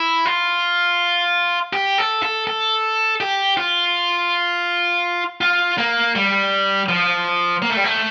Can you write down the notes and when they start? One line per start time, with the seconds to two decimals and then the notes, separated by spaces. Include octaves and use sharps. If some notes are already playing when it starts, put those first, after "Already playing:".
Already playing: E4
0.26 F4
1.73 G4
1.98 A4
2.23 A4
2.47 A4
3.20 G4
3.57 F4
5.41 F4
5.78 A#3
6.16 G3
6.89 F3
7.62 A#3
7.70 A3
7.77 G3
7.84 A3